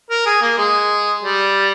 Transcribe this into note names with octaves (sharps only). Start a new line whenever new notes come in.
A#4
G#4
A#3
G#3
G3